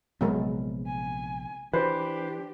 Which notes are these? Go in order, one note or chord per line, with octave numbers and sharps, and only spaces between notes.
A#1 C3 F#3 G#3 B3 A#4
G#5
E3 D4 G4 B4 C5